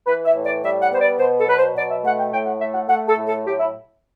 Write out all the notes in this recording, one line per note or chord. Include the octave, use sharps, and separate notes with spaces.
E3 B4
E5
A2
D5
G3 E5
F#5
B3 C5
D5
B2 C5
A4
F#3 B4
C5
B2 D5
E5
A3 F#5
G5
A2 G5
F#5
A3 E5
F#5
A3 F#5
A4
A2
A4
F#3 G4
E4